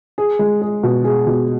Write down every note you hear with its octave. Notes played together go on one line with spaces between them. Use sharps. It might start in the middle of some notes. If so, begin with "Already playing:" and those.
G#4
G#3
G#4
B2
G#4
B2